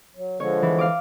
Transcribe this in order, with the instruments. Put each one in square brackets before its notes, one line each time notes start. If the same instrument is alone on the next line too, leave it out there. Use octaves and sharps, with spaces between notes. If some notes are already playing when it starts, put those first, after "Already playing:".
[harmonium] F#3
[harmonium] D3 F3 G#3 [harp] C#5
[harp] E3
F5 D6